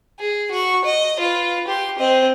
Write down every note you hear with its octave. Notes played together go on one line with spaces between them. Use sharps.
G#4
F#4 C#6
D#5
F4 B4
G4 C6
C4 D#5